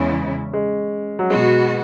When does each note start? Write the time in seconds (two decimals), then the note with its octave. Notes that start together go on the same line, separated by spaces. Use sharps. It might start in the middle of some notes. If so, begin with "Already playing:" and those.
Already playing: E2 C#3 G#3 C#4 E4
0.53 G#3
1.19 F#3
1.30 B2 G#3 B3 F#4